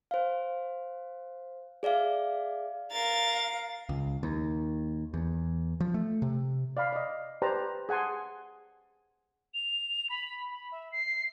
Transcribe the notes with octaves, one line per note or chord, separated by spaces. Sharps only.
C5 F5
G#4 D5 E5 F5
A#4 F5 A6
C#2
D#2
E2
F3
A3
C3
D5 F5 B5
D5 D#5
G4 B4 C5 D5 A5 A#5
G#4 F#5 G#5 A5 C6
F7
B5
B5
E5
C7